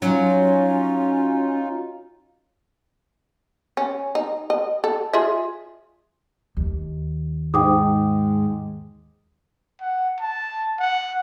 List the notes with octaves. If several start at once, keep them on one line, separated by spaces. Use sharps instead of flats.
F#3 C#4 D#4 F4
C#4
D#4
D#5
A4
F4 G#4 E5
D#2
G#2 G5 D6 D#6
F#5
A5
F#5